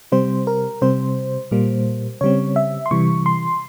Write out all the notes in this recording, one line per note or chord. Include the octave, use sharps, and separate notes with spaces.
C3 G3 C4 C5
A#4
C3 G3 C4 C5
A#2 G3 A#3
C#3 G3 C4 C#5
E5
C6
C3 E3 G3 C#6
C6